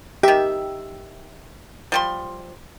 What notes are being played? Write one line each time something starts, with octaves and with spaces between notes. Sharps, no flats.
D#3 G4 E5
F3 G3 C6